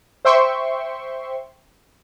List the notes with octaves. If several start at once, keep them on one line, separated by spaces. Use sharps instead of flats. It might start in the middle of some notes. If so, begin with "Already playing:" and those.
C5 E5 G5 C6 C#6